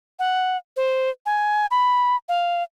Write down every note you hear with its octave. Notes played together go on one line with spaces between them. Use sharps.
F#5
C5
G#5
B5
F5